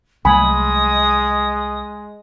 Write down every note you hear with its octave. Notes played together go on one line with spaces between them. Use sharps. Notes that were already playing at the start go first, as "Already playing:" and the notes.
C2 F#3 G#3 A3 G#5 B5 D#6